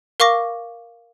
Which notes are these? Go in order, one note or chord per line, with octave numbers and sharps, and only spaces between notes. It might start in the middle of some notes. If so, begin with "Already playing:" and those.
A#4 F5 C#6 D6 A#6